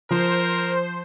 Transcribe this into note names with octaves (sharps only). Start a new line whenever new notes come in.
F3 A#4 C5